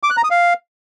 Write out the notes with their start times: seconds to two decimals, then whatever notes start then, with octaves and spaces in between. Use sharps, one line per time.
0.03 D6
0.10 F#6
0.17 A#5
0.24 D#6
0.31 F5